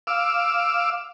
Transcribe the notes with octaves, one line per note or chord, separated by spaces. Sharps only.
F5 D6 E6